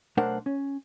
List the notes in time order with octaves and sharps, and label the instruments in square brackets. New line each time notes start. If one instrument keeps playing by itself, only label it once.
[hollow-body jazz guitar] B1 A3 D4 A#4 C5 F#5
C#4